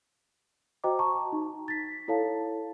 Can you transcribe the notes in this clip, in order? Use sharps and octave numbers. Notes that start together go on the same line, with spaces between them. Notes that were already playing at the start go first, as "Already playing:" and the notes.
F#4 C5 D#5 G5 A#5 D6
A5 A#5 C#6
D#4
A6 B6
E4 A4 C#5 F5 A5